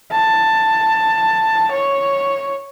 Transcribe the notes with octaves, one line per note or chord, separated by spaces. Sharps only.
A5
C#5